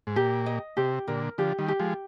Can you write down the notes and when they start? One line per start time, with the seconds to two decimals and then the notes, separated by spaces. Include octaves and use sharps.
0.07 G#2
0.16 A#2 G4
0.46 D#5
0.77 C3 G4
1.08 A#2 D3 A#4
1.38 D3 F3 G4
1.59 D#3 G3
1.68 G4
1.79 F3 G#3